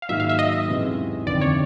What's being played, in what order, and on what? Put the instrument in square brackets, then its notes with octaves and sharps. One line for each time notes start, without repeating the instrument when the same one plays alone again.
[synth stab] F5
[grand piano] G#2 D#3 F#3 A#3 D#4 [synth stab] E5
[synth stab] F5
E5
D#5
[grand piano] E2 C3 E3 G#3 C#4
[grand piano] G1 F2 C3 D#3 [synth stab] D5
[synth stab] C#5